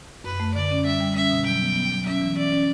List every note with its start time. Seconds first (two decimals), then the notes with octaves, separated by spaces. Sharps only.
0.24 F#2 B4
0.40 A3
0.55 D3 D5
0.71 C#4
0.85 G3 E5
1.00 G3
1.15 C#4 E5
1.31 B2
1.46 F#3 G5
1.61 B3
1.76 B3
1.92 F#3
2.06 C#4 E5
2.21 E3
2.37 C#4 D5
2.52 C#4